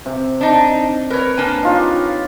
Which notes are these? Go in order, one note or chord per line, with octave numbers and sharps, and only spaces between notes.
C3
D4 D#4
A#4 B4 C#5
A#3 D4 G#5
D#4 F4 C#5
G4